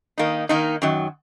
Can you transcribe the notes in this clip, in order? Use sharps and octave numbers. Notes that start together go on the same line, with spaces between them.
D#3 A#3 D#4
D#3 A#3 D#4
F#2 D#3 F#3